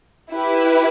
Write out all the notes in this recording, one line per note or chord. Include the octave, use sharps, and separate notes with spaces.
E4 G4 B4